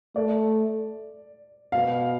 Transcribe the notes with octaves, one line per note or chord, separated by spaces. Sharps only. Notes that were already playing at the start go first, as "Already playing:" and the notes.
A3 D5
B2 F5